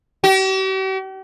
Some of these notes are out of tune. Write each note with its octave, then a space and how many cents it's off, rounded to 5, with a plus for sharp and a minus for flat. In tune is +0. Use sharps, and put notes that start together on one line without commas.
G4 -45